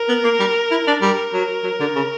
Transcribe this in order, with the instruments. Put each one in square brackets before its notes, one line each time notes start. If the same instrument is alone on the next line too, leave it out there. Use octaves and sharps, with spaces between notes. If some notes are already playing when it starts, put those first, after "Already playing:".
Already playing: [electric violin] A#4
[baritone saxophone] B3
A#3
G3
E4
D4
[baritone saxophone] G3 [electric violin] A#4
[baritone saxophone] F#3
F#3
D3
C#3